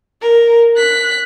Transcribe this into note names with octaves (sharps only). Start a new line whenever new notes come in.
A#4
F#6 B6